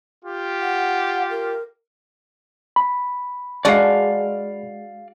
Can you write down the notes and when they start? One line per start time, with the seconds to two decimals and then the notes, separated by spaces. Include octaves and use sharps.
0.23 F4 G4
0.61 F#5
1.30 A#4
2.76 B5
3.65 G#3 D4 F#4 D5 F5